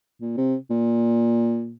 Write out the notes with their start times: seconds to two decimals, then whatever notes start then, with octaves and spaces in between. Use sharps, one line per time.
0.21 A#2
0.37 C3
0.70 A#2